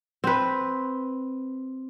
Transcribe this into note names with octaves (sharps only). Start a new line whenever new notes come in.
C4 B4